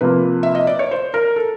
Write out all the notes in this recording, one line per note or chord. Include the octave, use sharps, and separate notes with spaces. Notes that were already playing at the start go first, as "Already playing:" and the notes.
C3 F3 A#3 B4
E5
D#5
D5
C#5
C5
A#4
A4